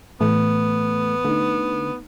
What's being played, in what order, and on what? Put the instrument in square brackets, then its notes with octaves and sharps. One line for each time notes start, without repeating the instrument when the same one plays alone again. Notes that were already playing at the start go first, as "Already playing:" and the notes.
[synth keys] A2 E3 [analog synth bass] A3 [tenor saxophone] B3
[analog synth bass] D3 [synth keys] A3 D#4